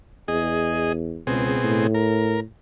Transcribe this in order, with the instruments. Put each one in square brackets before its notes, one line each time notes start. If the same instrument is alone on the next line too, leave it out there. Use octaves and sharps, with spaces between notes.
[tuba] E2 [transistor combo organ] G#4 D#5
[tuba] C#2 [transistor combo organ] B2 C4 G#4
[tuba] A2
[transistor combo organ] A#4